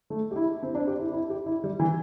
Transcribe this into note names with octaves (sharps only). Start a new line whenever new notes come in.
A3
G4
E4
C4
D4
G4
E4
E4
G4
E4
G3
E3